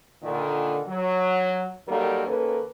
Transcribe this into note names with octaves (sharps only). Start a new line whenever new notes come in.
A#2 D3 D#3
F#3
D#3 F#3 G3 A#3 A4 A#4
D#3 A#3 C#4 A4 B4